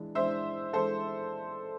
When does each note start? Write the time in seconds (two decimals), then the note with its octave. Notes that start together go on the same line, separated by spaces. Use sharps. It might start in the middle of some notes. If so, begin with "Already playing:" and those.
Already playing: E3 G#3 D4
0.15 E3 G#3 D4 C5 E5
0.73 E3 G#3 D4 A4 C5